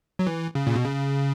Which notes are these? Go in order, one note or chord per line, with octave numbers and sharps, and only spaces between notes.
F#3
E3
C#3
A#2
B2
C#3